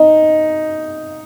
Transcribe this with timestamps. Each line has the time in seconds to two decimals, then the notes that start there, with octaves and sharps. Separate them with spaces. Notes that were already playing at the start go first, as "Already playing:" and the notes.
Already playing: D#4